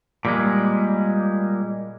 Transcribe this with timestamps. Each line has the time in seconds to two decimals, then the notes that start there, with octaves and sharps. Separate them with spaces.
0.25 A#2 G3 G#3